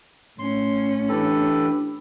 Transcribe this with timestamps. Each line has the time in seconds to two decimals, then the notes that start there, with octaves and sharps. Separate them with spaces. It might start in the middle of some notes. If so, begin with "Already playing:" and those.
0.39 A2 C#4 C6
1.09 E3 D4 G4 A4 B4